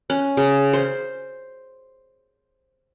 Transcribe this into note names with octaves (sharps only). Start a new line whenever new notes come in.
C#4
C#3
C5